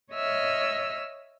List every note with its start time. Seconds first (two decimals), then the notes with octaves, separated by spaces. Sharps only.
0.12 C#5 D#5 E5 E6 F6